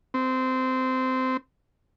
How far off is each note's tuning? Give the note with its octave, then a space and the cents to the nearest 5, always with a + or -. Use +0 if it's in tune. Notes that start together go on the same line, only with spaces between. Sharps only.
C4 -15